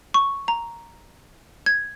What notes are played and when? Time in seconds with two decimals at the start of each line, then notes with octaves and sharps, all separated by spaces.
0.14 C#6
0.48 A#5
1.66 G#6